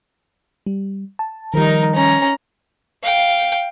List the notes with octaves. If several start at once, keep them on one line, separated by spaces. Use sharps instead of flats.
G3
A5
D#3 F3 G3 D#4 A#4
C#4 A#5
F5 G5